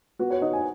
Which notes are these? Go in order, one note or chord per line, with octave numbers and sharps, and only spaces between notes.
B3 F#4
C#5
D#4 D#5
G#5